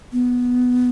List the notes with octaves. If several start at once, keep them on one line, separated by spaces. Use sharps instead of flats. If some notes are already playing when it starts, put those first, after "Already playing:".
B3